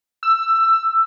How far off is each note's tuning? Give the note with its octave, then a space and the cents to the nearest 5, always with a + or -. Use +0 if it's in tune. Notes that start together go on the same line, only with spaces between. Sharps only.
E6 +15